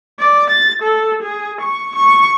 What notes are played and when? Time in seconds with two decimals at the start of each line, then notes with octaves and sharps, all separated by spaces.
0.19 D5
0.50 A6
0.82 A4
1.22 G#4
1.61 C#6
1.96 C#6